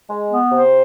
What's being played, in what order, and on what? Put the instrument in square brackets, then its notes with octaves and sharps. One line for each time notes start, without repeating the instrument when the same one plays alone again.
[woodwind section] G#3
B3
[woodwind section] C3 [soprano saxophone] C5